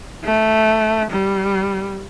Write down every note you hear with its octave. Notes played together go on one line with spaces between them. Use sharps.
A3
G3